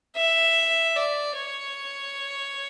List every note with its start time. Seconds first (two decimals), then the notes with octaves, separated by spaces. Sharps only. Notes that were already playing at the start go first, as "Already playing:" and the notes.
0.16 E5
0.96 D5
1.36 C#5